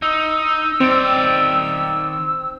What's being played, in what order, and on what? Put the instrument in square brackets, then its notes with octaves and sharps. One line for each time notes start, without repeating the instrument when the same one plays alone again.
[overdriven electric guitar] D#4 [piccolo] E6
[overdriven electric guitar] D#3 D5 [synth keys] C4